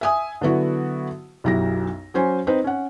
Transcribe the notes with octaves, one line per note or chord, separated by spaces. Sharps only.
E5 G#5 D#6
D3 F#3 B3 E4 F#4
B1 F#2 E4 G4 A#6
F#3 C#4 C5 G#5
C4 D#4 B4 C5
C#4 F#5